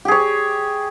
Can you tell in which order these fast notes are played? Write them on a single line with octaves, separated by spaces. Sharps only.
G4 G#4 C#5